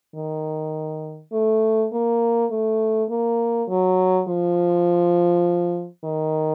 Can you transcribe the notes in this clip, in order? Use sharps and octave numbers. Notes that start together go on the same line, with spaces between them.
D#3
A3
A#3
A3
A#3
F#3
F3
D#3